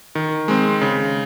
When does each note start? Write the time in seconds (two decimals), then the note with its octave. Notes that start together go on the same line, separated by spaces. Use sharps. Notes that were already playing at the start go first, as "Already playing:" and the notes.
0.15 D#3
0.48 G#3 C4
0.81 C#3